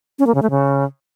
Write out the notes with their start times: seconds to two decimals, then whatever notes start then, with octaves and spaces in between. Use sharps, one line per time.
0.19 C#4
0.27 A#3
0.35 C#3
0.42 A3
0.50 C#3